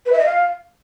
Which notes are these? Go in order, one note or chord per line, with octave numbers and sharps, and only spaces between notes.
B4
E5
D#5
F5